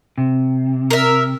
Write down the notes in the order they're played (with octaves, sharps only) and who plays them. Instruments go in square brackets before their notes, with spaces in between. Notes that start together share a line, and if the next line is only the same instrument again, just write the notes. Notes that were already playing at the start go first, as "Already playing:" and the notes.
[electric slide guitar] C3
[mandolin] A#4 E5